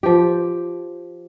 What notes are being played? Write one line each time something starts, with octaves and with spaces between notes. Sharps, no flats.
F3 G4